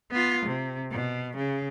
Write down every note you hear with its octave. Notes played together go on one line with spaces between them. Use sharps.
B3 F4
C3
B2
C#3